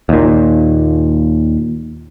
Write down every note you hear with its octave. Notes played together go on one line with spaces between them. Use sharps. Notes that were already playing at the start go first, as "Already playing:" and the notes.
D#2 A#2